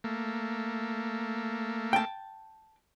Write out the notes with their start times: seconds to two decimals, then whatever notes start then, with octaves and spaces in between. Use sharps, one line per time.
0.04 A3 A#3
1.93 G5 A5